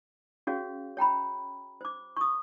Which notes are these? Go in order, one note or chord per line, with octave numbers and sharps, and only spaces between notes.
C#4 F#4 G#4 C#5 F5
C#5 G5 A#5 B5
C5 D6
C#6 D#6